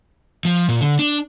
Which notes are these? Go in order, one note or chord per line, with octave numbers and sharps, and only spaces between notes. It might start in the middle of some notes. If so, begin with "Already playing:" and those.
F3
A#2
D3
D4